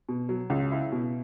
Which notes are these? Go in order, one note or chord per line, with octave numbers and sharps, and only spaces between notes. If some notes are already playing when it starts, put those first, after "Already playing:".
B2
F#3
C#2
E4
B2